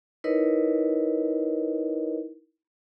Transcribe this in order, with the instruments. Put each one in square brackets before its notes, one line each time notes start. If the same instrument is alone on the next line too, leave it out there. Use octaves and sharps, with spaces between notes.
[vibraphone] D#4 E4 A#4 B4 C#5 D#5